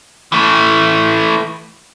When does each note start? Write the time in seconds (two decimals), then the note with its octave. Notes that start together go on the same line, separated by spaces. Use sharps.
0.32 E3 A3